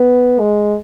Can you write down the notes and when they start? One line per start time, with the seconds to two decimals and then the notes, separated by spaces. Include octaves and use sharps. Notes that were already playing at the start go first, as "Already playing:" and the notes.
Already playing: B3
0.40 G#3